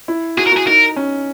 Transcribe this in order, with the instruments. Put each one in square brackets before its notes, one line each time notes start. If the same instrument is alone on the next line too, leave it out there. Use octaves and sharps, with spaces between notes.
[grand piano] E4
[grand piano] F#4 [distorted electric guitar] G#4
[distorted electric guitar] A#4
[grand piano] F#4
[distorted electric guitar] G#4
[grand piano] D#4 [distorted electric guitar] A#4
[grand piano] C#4